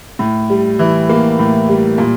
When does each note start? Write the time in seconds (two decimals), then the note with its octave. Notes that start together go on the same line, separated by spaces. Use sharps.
0.19 A2
0.50 G3
0.79 E3
1.09 A#3
1.39 A2
1.69 G3
1.98 A#2